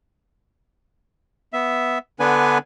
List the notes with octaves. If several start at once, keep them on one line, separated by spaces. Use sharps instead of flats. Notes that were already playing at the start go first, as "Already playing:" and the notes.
B3 E5
D3 B3 D4 B4 G#5